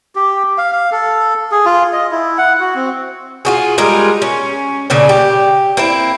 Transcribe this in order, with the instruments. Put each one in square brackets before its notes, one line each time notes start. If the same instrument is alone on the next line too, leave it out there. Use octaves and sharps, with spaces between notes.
[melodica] G4
F5
F5
A4
G#4
F4
D#5
E4
F#5
F#4
C4
[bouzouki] F4 F#4 G#4
G3 G#3 F4 A#4
C#4
A#2 C#3 C#4 D4
G4
A#3 C4 E4